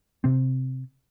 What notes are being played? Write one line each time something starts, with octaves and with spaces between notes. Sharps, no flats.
C3 C4